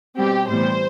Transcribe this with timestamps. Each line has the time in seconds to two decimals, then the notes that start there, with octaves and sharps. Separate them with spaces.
0.17 B2 G3 C4 G4
0.48 A2 E3 G3 B3 C5